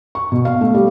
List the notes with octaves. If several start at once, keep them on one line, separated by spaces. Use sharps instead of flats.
C#6
B2
F5
A3
G3